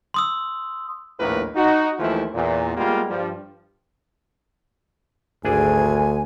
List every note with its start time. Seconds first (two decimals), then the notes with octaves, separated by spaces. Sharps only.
0.14 C6 D#6 E6
1.19 A#1 D#2 A2 E4 A#4 B4
1.55 D#4 F#4
1.98 D#2 E3 F3 A3 E4 F4
2.34 E2 A#2
2.77 G3 G#3 A#3 B3 F4 G4
3.10 G2 F3 G3
5.45 G#1 D2 D4 G#4 G#5